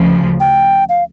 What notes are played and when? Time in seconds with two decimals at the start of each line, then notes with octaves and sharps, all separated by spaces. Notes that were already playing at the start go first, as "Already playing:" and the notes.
Already playing: D2 C#3 F3
0.40 G5
0.89 F5